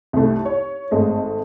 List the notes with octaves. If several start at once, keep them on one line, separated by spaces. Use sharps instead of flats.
C2 A3
C#5
G#1 G#3 A3 D#5